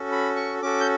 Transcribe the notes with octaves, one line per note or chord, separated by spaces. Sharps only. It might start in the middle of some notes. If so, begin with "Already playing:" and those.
Already playing: C#4 F#4 A4
B5
C#6
C#4 F#4 A4 D6
G6